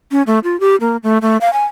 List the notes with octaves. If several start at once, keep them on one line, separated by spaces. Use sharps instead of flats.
C#4
A3
F4
G4
A#3
A3
A3
F5
G#5